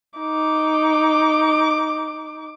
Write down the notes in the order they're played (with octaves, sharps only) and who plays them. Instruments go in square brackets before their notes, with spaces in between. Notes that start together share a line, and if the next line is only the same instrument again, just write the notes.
[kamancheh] D#4 D6